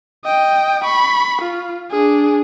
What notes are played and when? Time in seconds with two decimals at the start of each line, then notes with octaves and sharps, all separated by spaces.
0.25 D#5 G5
0.85 B5 C#6
1.42 F4
1.91 D4 G#4